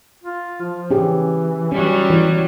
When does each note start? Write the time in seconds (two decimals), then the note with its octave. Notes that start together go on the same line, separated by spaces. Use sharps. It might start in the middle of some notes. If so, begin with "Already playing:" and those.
0.24 F4
0.62 F3
0.90 E3 C#4 G4 G#4
1.72 F#3 G3 C#4
2.10 E3